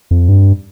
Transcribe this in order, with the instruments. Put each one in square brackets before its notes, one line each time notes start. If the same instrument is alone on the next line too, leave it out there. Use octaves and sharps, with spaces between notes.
[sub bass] F2
G2